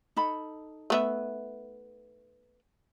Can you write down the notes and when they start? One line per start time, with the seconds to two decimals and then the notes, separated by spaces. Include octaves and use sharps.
0.16 D#4 A4 B5
0.90 A3 B3 E5